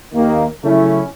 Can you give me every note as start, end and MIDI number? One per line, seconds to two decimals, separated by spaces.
0.14 0.44 39
0.14 0.44 51
0.14 0.44 58
0.64 1.02 49
0.64 1.02 54
0.64 1.02 57
0.64 1.02 61
0.64 1.02 64